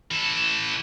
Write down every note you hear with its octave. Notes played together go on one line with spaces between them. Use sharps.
E3 A4